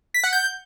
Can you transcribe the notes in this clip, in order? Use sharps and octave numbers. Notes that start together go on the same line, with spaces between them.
B6
F#5
G6